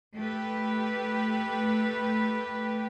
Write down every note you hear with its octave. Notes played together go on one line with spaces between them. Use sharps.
A3 G4 B4